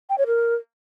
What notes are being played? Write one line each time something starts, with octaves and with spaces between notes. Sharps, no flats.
G5
C#5
A#4